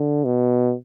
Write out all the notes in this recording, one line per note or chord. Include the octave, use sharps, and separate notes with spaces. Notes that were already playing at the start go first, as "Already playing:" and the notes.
Already playing: D3
B2